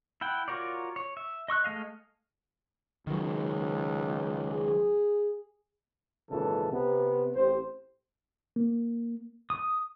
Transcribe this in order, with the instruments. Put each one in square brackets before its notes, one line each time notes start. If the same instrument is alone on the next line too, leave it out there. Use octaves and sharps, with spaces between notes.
[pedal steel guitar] E4 F#5 G5
F4 F#4 A#4 C#5 D5
C#5
E5
D#5 C#6 E6 F#6
G#3 A3 D#5 F5
[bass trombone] C#2 [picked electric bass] D#3 F#3
[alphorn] G#4
[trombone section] G#1 C#2 A#2 E3 A4
C3 B3
A1 C4 G4 C5
[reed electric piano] A#3
[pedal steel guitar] D#6